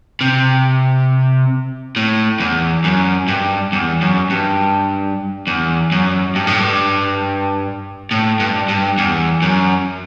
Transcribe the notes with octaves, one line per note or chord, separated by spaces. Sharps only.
C3
A2
E2
F#2
G2
E2
F#2
G2
E2
F#2
G2
A2
G2
A2
G2
G2
E2
F#2